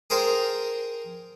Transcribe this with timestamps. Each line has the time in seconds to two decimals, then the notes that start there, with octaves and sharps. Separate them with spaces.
0.10 G#4 A#4 C5 F5 G5 A5